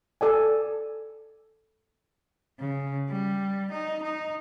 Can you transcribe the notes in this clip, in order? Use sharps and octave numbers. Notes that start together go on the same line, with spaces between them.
A4 D5 G#5
C#3
G3
D#4
D#4